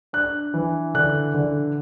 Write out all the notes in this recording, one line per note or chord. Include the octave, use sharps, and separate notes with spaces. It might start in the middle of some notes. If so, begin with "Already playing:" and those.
D4 F#6
E3
D3 F#6
D3